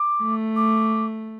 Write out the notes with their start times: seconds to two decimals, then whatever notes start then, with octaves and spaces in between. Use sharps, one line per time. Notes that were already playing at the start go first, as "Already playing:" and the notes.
Already playing: D6
0.21 A3
0.56 D6